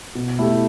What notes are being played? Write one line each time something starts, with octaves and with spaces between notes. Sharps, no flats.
B2
A3 E4 G4